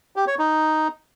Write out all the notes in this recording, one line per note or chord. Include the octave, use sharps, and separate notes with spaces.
G4
C#5
D#4